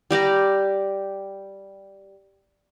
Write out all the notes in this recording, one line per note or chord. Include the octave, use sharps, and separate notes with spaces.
G3 G4 D5 A#5